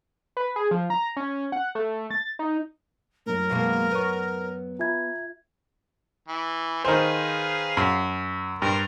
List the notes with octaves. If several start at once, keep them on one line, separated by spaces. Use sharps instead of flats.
B4
G#4
F3
A#5
C#4
F#5
A3
A6
D#4
F#2 A2 A#4
B2 G#3 A#3
B3 C#5
F4 E5 G#5 A#5 B5 G#6
E3
D#3 G#4 B4 C5 F5
F#2
G2 A#4 C5